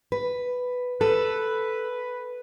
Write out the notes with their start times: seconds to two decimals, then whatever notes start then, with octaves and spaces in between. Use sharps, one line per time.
0.12 B4
1.01 A4 B4